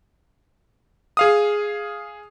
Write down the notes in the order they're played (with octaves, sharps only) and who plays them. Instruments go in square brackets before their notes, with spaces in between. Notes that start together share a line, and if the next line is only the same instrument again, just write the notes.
[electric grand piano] G#4 F5 D#6